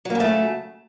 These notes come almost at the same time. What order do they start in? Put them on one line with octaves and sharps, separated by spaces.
F#3 A#3 C#3 A3